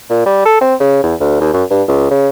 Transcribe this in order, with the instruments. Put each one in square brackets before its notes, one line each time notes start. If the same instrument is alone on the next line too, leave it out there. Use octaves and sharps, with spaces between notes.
[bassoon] A#2
G3
A4
C4
C#3
E2
D2
D#2
F#2
G2
C#2
C#3